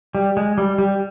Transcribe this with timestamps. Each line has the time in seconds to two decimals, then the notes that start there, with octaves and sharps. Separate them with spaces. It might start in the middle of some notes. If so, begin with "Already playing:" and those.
0.15 G3
0.37 G#3
0.58 G3
0.78 G3